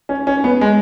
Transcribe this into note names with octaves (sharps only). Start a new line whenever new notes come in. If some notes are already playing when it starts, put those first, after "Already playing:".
C#4
C#4
B3
G#3